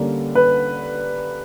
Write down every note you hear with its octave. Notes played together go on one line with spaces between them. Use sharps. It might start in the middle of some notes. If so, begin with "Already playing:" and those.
Already playing: D3 G3 A#3 C#4
B4